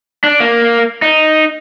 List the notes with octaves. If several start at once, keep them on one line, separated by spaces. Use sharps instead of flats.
D4
A#3
D#4